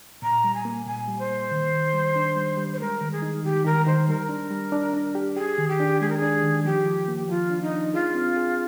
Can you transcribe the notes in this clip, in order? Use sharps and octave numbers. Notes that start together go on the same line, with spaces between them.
A#2 A#5
G3
G#5
A#3
A#2 G#5
G3
C5
A#3
D#3
D#3
G3
D4
G3
G3
C5
G#3 A#4
D#3
G#4
D#4
D#3 G4
D#3 A#4
D#3 C5
G3 A#4
D4
G3
D4
D4
G4
G4 G#4
D#3
G4
D4
G#3 G#4
A#4
G#4
D4
D#3
F3 G4
F3
A#3
F3 F4
D4
D#4
D4
F4 G#4
C4
G#4